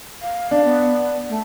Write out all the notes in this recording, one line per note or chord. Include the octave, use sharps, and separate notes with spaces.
F5
D4
B3
A3